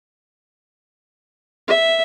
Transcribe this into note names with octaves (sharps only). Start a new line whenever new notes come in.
E5